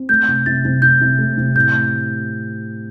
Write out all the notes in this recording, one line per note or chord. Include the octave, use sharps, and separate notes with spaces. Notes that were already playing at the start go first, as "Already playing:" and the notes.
Already playing: C4
A3 G6
C3
C3 A6
C3
C3 G6
C3
A3
C3
A2 G6